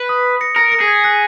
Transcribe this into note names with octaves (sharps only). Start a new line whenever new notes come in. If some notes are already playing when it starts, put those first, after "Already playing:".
Already playing: B4
D#6
A#6 C#7
A#4 A#6 C#7
A#6 C#7
G#4
G#6 B6
F#6 A#6